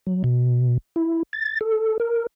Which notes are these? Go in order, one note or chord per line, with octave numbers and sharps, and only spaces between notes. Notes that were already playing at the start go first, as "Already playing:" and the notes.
F#3
B2
E4
A6
A4
A#4